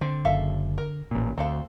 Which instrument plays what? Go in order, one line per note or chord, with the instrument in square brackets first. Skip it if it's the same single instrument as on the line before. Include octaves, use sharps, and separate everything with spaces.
[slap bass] D3 [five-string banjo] C4
[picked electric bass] F#1 [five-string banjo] A4 E5 F5
[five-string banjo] A#4
[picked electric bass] A1 A#2
[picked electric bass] D2 [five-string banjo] C4 A4 F5